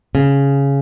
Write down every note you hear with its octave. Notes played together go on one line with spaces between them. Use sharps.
C#3